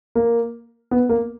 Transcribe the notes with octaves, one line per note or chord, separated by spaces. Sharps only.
A#3
B3
A#3